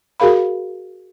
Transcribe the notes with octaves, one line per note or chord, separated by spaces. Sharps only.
F#4 G#4 A#4 F5 B5